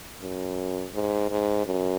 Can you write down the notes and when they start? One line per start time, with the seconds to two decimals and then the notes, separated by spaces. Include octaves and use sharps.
0.22 F#2
0.94 G#2
1.30 G#2
1.66 F#2